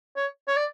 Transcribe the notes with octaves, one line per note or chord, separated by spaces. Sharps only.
C#5
C#5
D5